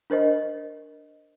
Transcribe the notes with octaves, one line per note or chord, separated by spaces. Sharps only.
D4 A#4 C5 D#5